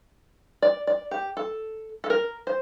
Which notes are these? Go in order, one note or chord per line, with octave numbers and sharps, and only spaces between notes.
D5
D5
G4
A4
A4
A#4
C5